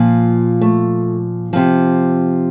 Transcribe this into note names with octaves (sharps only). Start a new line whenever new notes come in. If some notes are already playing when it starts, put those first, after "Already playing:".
Already playing: A#2 F3
A3
C3 F3